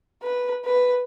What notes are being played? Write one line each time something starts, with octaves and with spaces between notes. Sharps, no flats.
B4
B4